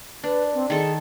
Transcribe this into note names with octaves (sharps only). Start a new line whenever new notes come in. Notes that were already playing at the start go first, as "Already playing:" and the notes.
D4 B4
C4
D#3 G#4 A4